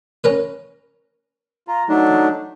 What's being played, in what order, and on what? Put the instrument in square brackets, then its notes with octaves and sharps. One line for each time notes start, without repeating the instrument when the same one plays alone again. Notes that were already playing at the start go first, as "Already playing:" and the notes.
[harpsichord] C#4 A#4 B4
[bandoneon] F4 [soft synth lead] A#5
[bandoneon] F#3 A3 D4 [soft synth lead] D#4